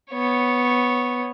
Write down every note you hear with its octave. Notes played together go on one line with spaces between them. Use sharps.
B3 C#5